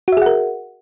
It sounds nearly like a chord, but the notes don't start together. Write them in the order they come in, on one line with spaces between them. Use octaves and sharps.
F#4 E5 G#4 F#5 A#4